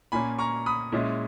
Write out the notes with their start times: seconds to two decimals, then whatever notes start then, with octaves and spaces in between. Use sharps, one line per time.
0.12 A#2 A#3 C#4 G#5 B5
0.39 A#5 C#6
0.66 B5 D#6
0.92 A#2 G#3 C#4 E4